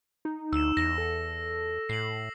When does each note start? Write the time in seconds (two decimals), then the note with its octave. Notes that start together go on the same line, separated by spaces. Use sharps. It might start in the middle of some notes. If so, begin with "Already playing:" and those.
0.25 D#4
0.53 D2 E6 E7
0.77 E2 A#6
0.98 A4
1.89 A2 C7 F#7